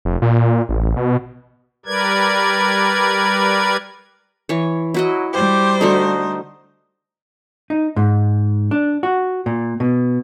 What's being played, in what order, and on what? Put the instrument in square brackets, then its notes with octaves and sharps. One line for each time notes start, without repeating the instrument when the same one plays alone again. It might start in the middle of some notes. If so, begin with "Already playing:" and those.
[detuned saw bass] F1
A#2
A1
B2
[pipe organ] G3 A#4 B4 D5 G#6
[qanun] E3 C#5
[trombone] F#3 [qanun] E4 F#4 D#5
[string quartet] G3 C5 [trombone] G4
[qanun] D3 A3 F#4 [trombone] D#4
[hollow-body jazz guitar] D#4
G#2
D4
F#4
A#2
B2